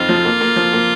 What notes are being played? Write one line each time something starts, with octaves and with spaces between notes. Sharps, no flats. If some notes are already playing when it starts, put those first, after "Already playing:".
Already playing: F2 C4 D#4 F4
F3
A#3
A#3
F3
A#3